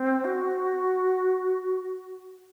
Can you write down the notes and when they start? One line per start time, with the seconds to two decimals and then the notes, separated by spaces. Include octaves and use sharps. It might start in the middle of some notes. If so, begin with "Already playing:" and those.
Already playing: C4
0.25 F#4